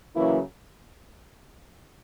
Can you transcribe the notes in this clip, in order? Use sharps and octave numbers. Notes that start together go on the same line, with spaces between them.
C#3 E3 F#3 A#3 C#4 E4